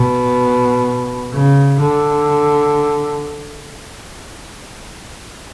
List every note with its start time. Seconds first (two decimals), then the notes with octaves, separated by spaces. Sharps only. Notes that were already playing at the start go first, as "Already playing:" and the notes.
Already playing: B2
1.33 C#3
1.81 D3